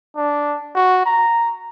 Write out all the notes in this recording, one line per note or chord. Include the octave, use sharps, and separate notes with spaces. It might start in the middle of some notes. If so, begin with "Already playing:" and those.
D4
F#4
A#5